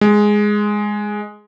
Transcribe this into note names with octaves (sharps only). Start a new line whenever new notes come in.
G#3